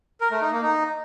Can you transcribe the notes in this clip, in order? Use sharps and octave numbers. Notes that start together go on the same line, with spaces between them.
A#4
A3
D#4
A#3
D#4